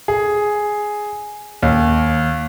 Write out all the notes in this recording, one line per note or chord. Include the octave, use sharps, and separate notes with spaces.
G#4
D#2